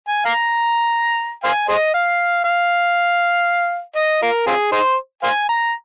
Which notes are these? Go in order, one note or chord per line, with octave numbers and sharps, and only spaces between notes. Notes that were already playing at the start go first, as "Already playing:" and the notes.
G#5
F5 A#5
C5 F5 G#5
G#4 C5 D#5
F5
F5
D#5
F4 A#4
C4 F4 G#4
D#4 G#4 C5
C5 F5 G#5
A#5